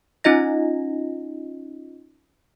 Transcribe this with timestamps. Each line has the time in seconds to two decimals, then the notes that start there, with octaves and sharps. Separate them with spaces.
0.24 C#4 D#4 F4 D#5 A#6